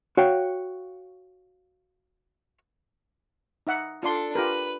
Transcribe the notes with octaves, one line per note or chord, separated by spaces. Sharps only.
F#4 C#5 F5 G5
D#4 E5 F#5
D4 F4 A4 D5 C6
F4 G4 A#4 B4